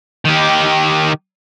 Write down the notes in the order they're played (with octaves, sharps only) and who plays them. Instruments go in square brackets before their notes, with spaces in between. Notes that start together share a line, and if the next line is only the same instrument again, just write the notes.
[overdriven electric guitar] D#3 G4